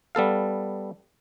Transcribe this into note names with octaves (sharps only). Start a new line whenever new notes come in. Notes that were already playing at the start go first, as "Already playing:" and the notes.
G3 B3 A4 F5